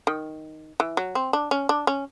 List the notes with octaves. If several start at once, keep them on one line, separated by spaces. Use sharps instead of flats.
D#3
E3
F#3
C4
D4
C#4
D4
C#4